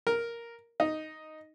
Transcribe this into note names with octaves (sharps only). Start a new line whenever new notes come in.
A#4
D#4